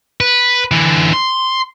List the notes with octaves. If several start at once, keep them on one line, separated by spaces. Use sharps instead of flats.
B4
D3 E3
C6